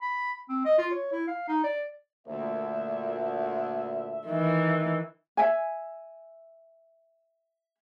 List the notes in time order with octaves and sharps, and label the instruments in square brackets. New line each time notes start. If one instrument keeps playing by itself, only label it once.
[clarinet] B5
C4
D#5
F4
C#5
E4
F5
D#4
D5
[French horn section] D2 A#2 [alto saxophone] E5
[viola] D#3 E3
[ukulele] E5 G#5